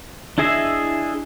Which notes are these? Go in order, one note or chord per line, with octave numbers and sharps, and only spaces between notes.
D4 E4 G#4 D#5 E5